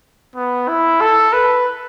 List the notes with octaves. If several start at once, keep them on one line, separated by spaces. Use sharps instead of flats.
B3
E4
A4
B4